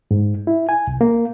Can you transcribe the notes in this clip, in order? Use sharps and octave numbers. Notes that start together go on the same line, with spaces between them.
G#2
E4
G#5
C2
A#3